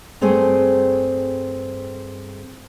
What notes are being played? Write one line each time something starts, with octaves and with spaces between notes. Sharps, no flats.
G2 A3 C4 G#4 C5 G#5